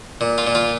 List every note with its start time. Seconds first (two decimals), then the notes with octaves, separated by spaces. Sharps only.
0.21 A#2
0.38 F4
0.47 A#2
0.55 F4